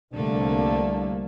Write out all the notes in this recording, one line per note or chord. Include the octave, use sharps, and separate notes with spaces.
C2 D3 A3 A#3 D4